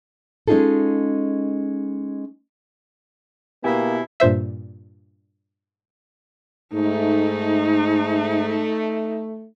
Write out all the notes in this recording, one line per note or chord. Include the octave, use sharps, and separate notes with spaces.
G#3 C#4 D#4 F4 G#4 A4
B2 A#3 B3 E4 G4 G#5
G2 A#2 C5 E5
G#2 A3 D#4